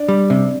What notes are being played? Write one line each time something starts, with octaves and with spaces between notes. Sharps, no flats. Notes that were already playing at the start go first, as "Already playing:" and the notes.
Already playing: D4
G3
C3